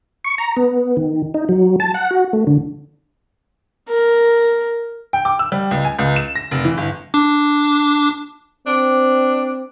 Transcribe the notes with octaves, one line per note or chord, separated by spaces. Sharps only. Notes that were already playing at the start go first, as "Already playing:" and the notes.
C#6
A#5
B3
D#3
D#4
F#3
A5
F#5
F#4
A3
D3
A#4
G5
D6
E6
G3
C#2
G#5
C#2
E7
A#6
F1
E3
G1
D4 D6
C4 D4